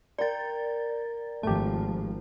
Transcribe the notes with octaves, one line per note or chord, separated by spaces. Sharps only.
A#4 D5 G5 A6
G#1 F3 A3 G4 A5